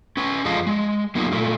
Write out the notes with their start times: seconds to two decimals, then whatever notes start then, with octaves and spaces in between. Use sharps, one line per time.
0.17 C#4 B4
0.45 F2 G#3 F4 D#5 F5 A5
0.67 G#3
1.15 F#3 A#3 B3 D#4 F4
1.32 A#2 A3 F4